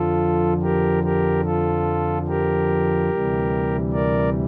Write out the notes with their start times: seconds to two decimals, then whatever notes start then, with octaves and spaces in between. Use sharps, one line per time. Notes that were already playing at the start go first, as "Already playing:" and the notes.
Already playing: F2 D3 F3 F4 A4
0.62 G4 A#4
1.04 G4 A#4
1.44 F4 A4
2.28 G4 A#4
3.10 D2 C3 E3 G3
3.92 A#4 D5